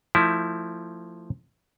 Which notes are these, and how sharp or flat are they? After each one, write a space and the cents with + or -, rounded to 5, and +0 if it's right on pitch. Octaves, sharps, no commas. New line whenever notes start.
F3 +0 A3 +25 E4 +0